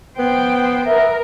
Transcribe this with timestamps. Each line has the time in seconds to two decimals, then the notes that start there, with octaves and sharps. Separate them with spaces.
0.19 B3 C5 G5
0.86 B3 A#4 E5